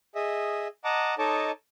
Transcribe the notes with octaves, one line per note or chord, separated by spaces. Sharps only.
G#4 D#5 E5
D#5 F#5 A5 A#5 D6
D#4 A4 C#5 D#5 A5 D6